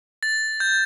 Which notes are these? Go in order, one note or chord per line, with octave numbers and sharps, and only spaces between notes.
A6
G6